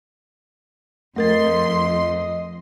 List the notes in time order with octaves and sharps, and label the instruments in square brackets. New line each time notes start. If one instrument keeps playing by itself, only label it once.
[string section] F2 C6 [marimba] A3 A#4 A6 [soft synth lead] D#5